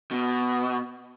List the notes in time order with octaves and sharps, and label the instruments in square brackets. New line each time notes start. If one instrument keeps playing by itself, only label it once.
[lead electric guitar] B2